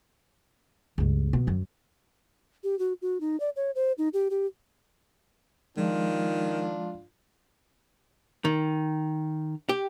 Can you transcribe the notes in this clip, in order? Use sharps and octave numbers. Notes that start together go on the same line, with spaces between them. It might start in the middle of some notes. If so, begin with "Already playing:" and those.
C#2 G2
B2 B3
F#2 F#3
G4
F#4
F#4
D#4
D5
C#5
C5
D#4
G4
G4
D#3 F3 G#3 D4 F4
D#3
G4